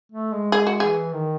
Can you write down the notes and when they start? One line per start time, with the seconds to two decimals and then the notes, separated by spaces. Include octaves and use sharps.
0.12 A3
0.33 G#3
0.52 G#3 G#4
0.67 F#4
0.80 E3 G#4
1.13 D#3